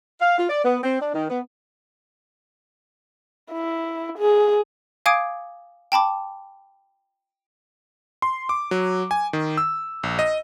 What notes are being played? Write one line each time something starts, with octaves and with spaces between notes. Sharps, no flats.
F5
F4
D5
B3
C4
D4
D#3
B3
E4
G#4
F5 G#5 D6 D#6 G#6 D7
G5 A5 B5 D6
C6
D6
F#3
G#5
D#3
E6
A#1
D#5